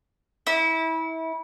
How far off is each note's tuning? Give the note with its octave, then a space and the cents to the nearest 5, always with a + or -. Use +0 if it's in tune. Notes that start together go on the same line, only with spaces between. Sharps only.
E4 -25